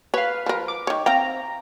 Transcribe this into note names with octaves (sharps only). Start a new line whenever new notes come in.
B4 C#5 F5
F3 A#4
D6
D#3 C#5
C4 F5 G5 A#5